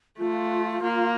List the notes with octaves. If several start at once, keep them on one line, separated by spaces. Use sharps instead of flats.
A3 F4
A#3